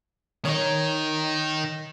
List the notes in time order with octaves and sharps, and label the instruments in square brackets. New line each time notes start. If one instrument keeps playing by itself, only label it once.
[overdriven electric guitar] D#3 D#4 [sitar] C#5